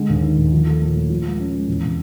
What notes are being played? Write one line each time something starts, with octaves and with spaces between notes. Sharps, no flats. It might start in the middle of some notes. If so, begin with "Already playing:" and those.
Already playing: D3 G#3
D#2
D#3
D#2
F3
A3
A#2
A3
F3
G#3
C#4
G#3
E2
C3